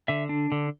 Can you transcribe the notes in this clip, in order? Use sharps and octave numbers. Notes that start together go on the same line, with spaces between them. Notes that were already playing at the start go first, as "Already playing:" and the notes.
D3 E5
D4
D3